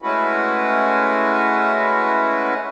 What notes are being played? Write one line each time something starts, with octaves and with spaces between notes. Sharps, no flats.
G#3 A3 C#4 E4 F#4 B4